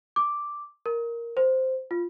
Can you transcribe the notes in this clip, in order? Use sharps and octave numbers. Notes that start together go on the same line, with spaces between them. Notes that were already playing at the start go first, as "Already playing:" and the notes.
D6
A#4
C5
F4